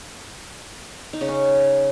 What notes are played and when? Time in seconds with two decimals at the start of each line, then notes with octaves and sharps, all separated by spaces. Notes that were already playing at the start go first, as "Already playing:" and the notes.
1.13 D#4
1.21 C#3
1.29 C#4